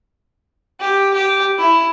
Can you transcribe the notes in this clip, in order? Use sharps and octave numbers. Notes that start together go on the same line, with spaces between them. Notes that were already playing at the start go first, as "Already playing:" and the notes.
G4
G4
E4